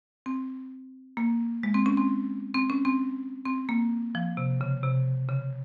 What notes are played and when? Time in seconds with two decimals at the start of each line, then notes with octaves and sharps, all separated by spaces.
0.26 C4
1.17 A#3
1.63 G#3
1.74 C4
1.86 C#4
1.97 C4
2.54 C4
2.70 C#4
2.85 C4
3.45 C4
3.69 A#3
4.15 F3
4.37 C3
4.61 C#3
4.84 C3
5.29 C#3